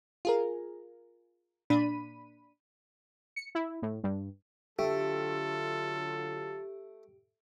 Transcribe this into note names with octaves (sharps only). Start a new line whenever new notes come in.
F4 G#4 A#4
A#2 D4 B5 D#7
C#7
E4
A2
G2
D3 F#3 A3 F4 G4 A4